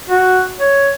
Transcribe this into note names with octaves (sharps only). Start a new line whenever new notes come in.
F#4
C#5